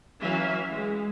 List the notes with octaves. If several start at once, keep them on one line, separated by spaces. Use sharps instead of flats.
E3 F#3 C#4 E5 F5
G#3